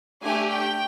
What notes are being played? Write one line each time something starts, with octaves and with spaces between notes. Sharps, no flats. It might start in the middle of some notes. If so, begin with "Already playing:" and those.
A3 D4 G4 G#5
G5